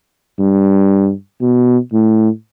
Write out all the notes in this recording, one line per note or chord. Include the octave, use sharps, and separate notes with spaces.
G2
B2
A2